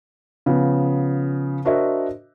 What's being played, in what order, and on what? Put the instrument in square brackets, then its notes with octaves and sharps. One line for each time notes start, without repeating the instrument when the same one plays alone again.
[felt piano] C#3 F3 B3
D4 F#4 A#4 C5 D#5 E5